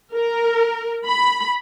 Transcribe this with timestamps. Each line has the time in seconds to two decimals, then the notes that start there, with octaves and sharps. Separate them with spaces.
0.13 A#4
1.05 B5